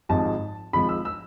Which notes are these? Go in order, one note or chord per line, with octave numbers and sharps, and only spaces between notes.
G#1 G#2 F3 G#3 A5
G#1 G#2 F3 G#3 B5
E6
E6